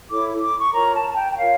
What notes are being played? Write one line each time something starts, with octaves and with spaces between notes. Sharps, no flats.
E4 A4 C#5 D6
D6
C#6
F4 A#4 C#5 A#5
A5
A5
G5
G5
F4 A#4 C#5 F5